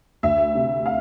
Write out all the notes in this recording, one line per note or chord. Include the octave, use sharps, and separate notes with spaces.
D2 E5
C3
F5